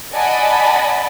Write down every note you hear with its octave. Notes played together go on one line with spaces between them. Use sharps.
D5 D#5 F#5 G#5 A5 B5